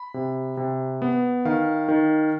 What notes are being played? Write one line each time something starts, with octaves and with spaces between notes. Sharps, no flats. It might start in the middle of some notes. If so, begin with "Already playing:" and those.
Already playing: B5
C3
C3
B3
D#3 F5
D#3